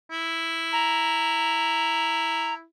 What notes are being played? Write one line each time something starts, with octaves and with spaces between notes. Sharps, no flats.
E4
A#5